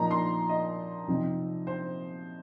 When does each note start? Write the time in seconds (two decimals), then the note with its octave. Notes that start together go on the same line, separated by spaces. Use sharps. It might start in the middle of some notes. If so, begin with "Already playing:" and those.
Already playing: A#2 F3 D#4 A#5
0.11 C6
0.49 D#5
1.08 C3 F3 C4 D#4
1.67 C5